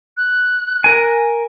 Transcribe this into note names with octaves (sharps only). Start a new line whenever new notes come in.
F#6
A#4 G#5